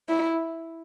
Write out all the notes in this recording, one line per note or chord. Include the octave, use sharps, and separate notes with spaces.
E4